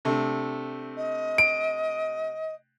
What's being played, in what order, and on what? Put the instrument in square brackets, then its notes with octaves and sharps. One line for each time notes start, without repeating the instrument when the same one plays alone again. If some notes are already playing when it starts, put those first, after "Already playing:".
[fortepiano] C3 A3 D4
[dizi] D#5
[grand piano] D7